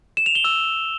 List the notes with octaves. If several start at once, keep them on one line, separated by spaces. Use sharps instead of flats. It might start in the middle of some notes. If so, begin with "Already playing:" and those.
E7
F7
G7
E6